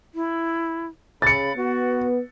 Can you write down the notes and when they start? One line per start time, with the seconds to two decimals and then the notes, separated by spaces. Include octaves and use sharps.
0.15 E4
1.22 C#3 B5 A6 C#7
1.57 B3 F#4